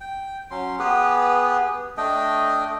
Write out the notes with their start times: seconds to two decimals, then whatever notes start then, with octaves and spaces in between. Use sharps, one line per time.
0.01 G5
0.51 F#3 C#4 C6
0.79 B3 G4 G#4 B4
1.97 A3 D4 D#5 G5